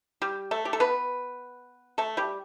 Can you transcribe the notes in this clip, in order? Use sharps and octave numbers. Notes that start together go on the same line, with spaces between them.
G3 G4
A3 A4
G4
A4
B3 B4
A3 A4
G3 G4